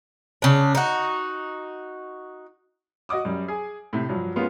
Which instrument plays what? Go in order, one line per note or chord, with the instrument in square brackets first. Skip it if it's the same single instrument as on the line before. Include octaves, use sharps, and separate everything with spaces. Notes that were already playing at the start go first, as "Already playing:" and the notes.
[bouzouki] C#3 D4
D#4 F#4
[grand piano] F#4 D#5 F#5 D6 D#6
F#2 G3
G#4 G#5
A2 C3
G2 F3 F#3
G#3 A#3 B3 C#4 F4